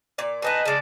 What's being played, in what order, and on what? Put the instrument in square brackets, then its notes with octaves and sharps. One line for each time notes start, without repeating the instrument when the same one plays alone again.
[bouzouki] A#2 D5
[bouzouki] A2 D#4 D#5 [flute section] B4 G#5 A5
[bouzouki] C#3 G#3 [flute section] D5 A5